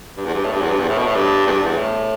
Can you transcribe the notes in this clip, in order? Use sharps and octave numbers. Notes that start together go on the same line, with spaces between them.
G2
E2
G2
A2
G2
E2
G2
E2
A2
B2
A2
G2
E2
G2
E2
A2